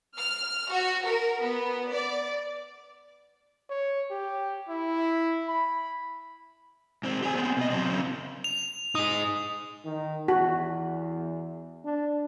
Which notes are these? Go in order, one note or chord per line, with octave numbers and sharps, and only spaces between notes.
F6
F#4
A#4
B3
D5
C#5
G4
E4
B5
G#2 C4
G4 G#5
B3 C4
B2 D#5
F#3 C4
F#2 C#3
F7
D#4 G#4 D#6
D#3
E2 F#4
D4